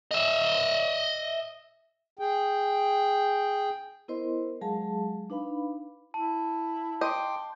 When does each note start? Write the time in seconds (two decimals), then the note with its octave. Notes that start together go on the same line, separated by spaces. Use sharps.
0.11 D#5 E5
2.19 G#4 G5
4.08 B3 E4 A#4 C5 D#5 C6
4.61 F#3 G#3 G#4 F5 A5
5.30 D4 D#4 B4 F5 B5
6.14 E4 A5
7.01 D#5 G5 C6 D6 G6